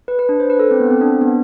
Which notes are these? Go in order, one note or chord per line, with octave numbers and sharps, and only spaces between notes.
B4
B4
D4
C5
B4
A4
C4
B3
C4
D4
B3